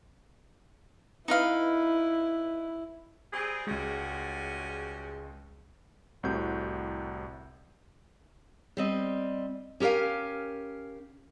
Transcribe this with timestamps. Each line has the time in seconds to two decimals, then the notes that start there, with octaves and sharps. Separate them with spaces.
1.28 D#4 E4 B4 F5
3.32 G3 C4 G#4
3.67 C#2 G3 G#3 C#4 F#4
6.23 C2 A2 C3 F#4 G6
8.77 G3 C4 D#5
9.80 C#4 G4 A#4 F5 G#5